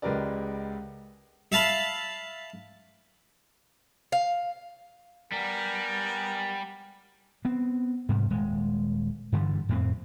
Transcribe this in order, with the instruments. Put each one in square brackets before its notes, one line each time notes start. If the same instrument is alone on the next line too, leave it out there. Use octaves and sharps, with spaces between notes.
[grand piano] C#2 G#3 G4 A#4 B4 D5
[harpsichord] E5 F5 A5 B5
[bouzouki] F5
[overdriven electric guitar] G3 [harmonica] B3 A#4 G#5
[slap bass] B3 C4
G#2 C3 G3
D#1 G#3
G2 D3 E3 G3
F2 A2 C4